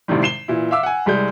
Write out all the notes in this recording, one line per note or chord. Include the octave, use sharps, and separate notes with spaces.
G#1 A2 C3 D#3 G3
C7 E7 G7
A#2 E3 E4
E5 F5 D6 E6
F#5 G#5
C2 G3 G#3 G6